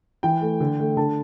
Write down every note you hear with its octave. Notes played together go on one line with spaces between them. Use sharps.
E3 G5
A3
D3
A3
D3 A5